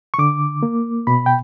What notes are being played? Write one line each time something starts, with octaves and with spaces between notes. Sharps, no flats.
C#6
D3 D6
A#3
B2 B5
G5